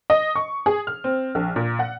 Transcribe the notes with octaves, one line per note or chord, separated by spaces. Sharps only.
D#5
C#6
G#4
F6
C4
A#1
A#2
F#5